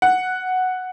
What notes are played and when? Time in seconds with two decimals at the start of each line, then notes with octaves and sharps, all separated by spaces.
0.02 F#5